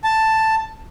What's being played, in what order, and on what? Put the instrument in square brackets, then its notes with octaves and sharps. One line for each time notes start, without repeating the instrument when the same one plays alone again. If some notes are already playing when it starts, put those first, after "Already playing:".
[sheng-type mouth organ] A5